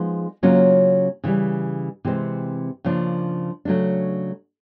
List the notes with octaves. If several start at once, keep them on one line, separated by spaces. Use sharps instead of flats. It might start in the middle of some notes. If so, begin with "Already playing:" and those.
Already playing: F3 G#3 B3 D#4 G#4
C#3 F#3 A#3 C#4 F4
C#3 E3 G3
C3 E3 G#3 C4
C#3 F3 A#3 D4
C#3 F#3 A3 D4